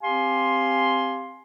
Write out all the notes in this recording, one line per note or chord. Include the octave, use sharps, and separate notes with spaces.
C4 G4 F5 G#5 C6